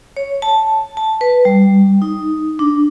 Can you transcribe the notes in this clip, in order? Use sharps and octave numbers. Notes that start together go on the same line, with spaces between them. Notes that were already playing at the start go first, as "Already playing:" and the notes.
C#5
A5
A5
B4
G3
D#4
D4